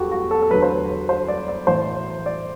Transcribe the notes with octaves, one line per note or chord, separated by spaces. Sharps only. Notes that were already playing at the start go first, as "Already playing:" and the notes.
Already playing: E2 F#3 F#4 G4 A4
F#4
A4
A4
E2 D3 F#3 B4
C5
B4
C5
D5
D5
A2 E3 C5
D5